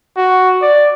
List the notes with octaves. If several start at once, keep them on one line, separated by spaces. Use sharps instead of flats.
F#4
D5